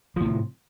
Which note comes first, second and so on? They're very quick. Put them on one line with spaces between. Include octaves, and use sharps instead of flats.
F3 A2 C3